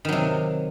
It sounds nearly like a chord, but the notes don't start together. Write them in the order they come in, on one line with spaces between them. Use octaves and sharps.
D#3 F#3 C3